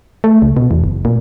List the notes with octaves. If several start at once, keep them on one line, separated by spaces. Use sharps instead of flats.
A3
C#2
B2
E2
F#1
A#2